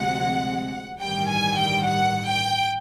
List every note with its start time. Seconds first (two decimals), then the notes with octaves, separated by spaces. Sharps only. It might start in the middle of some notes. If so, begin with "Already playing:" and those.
Already playing: D2 C3 F3 G#3 F#5
1.01 A1 G2 D#3 G3 G5
1.29 G#5
1.57 G5
1.86 F#5
2.28 G5